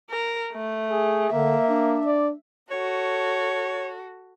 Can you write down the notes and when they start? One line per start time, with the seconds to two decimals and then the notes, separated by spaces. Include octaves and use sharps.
0.10 A#4
0.54 A3
0.91 G#4
1.32 D3 A#3 E5
1.69 D4
2.06 D5
2.71 F#4 A4 C#5